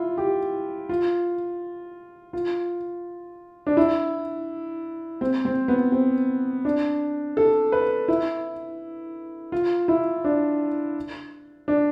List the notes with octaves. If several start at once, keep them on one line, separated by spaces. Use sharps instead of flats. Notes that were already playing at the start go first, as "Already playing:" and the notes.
Already playing: E4 F4
G4
F4
F4
D4
E4
C4
C4
B3
C4
D4
A4
B4
E4
F4
E4
D4
D4